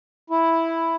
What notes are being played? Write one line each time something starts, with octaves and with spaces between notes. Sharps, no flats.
E4